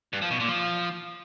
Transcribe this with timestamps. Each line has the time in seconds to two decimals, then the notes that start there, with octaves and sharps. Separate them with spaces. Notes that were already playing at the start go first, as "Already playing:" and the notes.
0.13 G2
0.22 F3
0.31 B2
0.40 A#2
0.48 F3